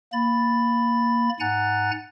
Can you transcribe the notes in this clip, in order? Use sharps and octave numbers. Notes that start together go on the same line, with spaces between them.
A#3 B5 A6
G#2 F#5 G#5 A#5 F#6 A6